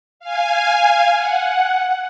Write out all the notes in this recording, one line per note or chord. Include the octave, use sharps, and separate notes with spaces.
F5 G#5
F#5